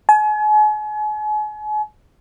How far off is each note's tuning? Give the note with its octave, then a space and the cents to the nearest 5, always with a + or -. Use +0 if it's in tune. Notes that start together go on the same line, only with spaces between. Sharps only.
G#5 +40